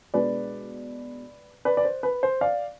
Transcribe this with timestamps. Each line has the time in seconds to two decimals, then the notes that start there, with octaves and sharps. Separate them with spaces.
0.14 B2 G#3 D4 B4 D5
1.65 B4 D5
1.77 D5
1.85 C5
2.03 B4
2.23 C5
2.41 D5 F5